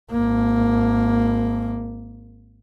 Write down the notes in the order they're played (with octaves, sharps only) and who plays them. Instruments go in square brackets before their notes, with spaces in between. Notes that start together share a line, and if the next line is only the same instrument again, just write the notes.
[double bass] G#1 A#3